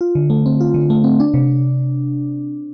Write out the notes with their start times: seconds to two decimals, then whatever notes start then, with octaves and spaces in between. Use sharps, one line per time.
0.01 F4
0.15 D3
0.30 A3
0.46 C4
0.61 F4
0.74 D3
0.90 A3
1.04 C4
1.20 D4
1.34 C3